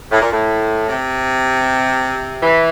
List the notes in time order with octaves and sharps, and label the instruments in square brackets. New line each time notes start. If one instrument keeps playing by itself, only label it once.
[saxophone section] A2
A#2
A2
C3
E3